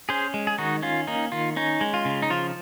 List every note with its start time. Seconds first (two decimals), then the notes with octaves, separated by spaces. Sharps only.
0.09 C#4 G#4 C5
0.34 G#3
0.47 G#4
0.58 D#3 D#4 F#4
0.82 C#4 F4
1.07 A#3 D#4
1.32 D#3 F4
1.56 C#4 D#4
1.81 G#3
1.94 F4
2.05 C#3
2.22 D#4
2.30 F3 F4